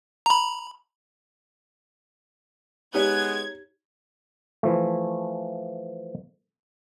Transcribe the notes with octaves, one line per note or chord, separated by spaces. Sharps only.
A#5 B5
G#3 B3 D#4 G4 C#5 G#6
E3 F3 A3